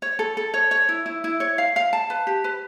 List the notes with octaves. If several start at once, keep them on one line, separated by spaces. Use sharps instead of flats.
C#5
A4
A4
C#5
C#5
E4
E4
E4
C#5
F5
F5
A5
B4
G4
B4